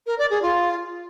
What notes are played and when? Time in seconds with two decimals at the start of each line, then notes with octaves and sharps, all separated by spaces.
0.07 A#4
0.19 D5
0.30 G#4
0.42 F4